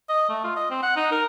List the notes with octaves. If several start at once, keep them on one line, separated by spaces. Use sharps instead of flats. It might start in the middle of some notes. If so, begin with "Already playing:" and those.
D#5
A3
F4
D#5
C4
F#5
D#4
A#4